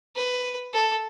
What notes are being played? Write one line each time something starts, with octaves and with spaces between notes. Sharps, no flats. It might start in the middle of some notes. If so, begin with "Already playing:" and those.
B4
A4